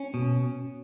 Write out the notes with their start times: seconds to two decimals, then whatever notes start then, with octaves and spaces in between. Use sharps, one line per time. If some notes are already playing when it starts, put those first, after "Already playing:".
Already playing: C#4
0.14 B2